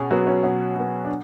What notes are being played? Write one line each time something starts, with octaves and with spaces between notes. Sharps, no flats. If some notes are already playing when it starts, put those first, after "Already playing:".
Already playing: B2 C#4 G#4
F#3 B3 F#4
C#4
B2 C#4
F#3 B3
D4